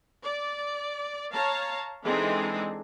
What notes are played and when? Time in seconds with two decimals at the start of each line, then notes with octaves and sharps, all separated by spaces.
0.23 D5
1.32 C#5 F5 A5 A#5
2.04 E3 G#3 C4 D4 D#4 A4